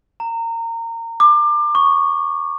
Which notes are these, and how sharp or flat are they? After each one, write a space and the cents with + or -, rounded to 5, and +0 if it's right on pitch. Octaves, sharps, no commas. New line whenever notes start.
A#5 -25
D6 +25
C#6 +5